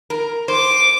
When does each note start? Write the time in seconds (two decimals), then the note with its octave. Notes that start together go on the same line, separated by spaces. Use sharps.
0.10 A#4
0.48 C5 D6